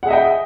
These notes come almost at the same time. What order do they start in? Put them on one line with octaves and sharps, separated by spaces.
F#5 G#4 E5 D#5 G5